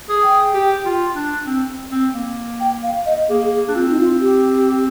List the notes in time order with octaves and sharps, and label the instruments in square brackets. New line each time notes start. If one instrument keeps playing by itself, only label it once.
[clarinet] G#4
[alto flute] G5
[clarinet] G4
F4
D4
C4
C4
A#3
[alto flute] G5
F5
D#5
[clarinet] A#3 [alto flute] G#4
[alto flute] G#4
[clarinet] D4
[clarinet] C4 [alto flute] F4
[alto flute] D#4
F4
G4